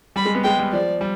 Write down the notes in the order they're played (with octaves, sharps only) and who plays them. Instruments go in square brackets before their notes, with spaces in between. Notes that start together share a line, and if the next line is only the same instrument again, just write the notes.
[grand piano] G3 [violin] B5
[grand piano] G#3
B3
[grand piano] G#3 [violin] G5
[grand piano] G3
[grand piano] F3 [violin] D5
[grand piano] G3